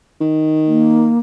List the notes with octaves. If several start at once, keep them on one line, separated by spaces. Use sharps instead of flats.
D#3
A#3